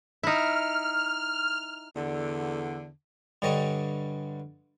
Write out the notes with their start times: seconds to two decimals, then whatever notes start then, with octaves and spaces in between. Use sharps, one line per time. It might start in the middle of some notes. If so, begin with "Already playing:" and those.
0.23 D#4 E4 F6
1.96 E2 D3
3.42 G2 D3 G3 C#5 D#5